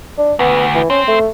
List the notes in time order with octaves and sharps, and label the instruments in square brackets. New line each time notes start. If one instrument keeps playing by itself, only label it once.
[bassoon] D4
[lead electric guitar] D2 [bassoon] B3
[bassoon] E3
[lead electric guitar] C4 [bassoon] C#4
[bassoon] A3